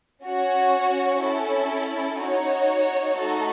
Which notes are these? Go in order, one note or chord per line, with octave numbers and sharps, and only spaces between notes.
C#4 F#4 C#5
C#4 E4 A4
D#4 F#4 C#5
A3 D#4 F#4 A4